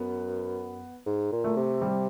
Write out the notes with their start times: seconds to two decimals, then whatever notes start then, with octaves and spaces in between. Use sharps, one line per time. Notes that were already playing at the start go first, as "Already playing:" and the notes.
Already playing: F#2 B3
1.06 G#2
1.32 A#2
1.44 A3
1.57 C3
1.81 G3